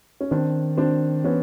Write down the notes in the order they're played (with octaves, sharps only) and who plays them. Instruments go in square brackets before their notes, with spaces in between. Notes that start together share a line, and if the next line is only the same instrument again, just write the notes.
[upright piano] C#4
[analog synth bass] D#3 [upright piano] C4 D4
[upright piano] C4 D4
[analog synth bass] E3 [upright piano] B3 C#4